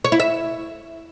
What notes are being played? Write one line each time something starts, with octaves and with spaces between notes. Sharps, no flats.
C#5
E4
E5